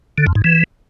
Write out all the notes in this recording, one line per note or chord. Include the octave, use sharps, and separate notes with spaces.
D3
F2
G#2
E3